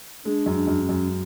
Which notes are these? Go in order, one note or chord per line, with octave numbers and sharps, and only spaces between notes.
G#3 D4
F#2
D4
F#2
C#4
F#2